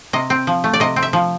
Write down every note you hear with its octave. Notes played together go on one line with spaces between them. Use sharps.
C3 D#5
C4
F3
A3
D5
C3 D#5
C4
E5
F3